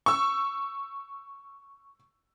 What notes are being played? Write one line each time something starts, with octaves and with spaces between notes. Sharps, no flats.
C#6 E6